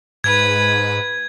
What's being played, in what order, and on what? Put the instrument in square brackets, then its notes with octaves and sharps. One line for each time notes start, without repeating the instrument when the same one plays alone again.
[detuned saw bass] G#2 [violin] B4 [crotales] G#6